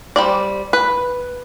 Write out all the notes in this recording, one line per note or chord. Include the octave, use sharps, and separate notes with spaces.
G3 C5 D5
B4